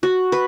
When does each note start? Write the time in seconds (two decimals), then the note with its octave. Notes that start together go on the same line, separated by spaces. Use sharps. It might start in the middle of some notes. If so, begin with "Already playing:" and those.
0.03 F#4
0.32 B4